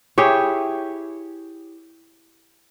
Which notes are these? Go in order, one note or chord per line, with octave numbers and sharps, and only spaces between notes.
E4 G4 G#4 C#5